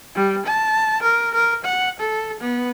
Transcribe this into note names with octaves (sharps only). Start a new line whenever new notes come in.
G3
A5
A#4
A#4
F#5
A4
B3